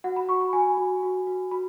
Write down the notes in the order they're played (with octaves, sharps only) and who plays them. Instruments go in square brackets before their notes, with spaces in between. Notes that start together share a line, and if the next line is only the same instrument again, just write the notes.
[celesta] F#4 F#5
B5
F#4 C#6
B5
F#4 G#5
F#4
F#4
F#4
F#4 B5